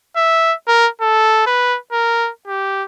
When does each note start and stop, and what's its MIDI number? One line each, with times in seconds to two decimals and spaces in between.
0.17 0.54 76
0.68 0.88 70
1.02 1.46 69
1.46 1.78 71
1.92 2.30 70
2.48 2.85 67